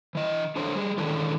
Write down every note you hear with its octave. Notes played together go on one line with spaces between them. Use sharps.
E3 D#5
D4 A4 C5 C#5
G3 G#4
D#3 E3 G#3 C#4 D4 A4